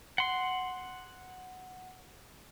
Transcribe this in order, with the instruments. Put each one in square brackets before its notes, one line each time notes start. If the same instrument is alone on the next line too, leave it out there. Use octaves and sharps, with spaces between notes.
[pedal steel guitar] F#5 C6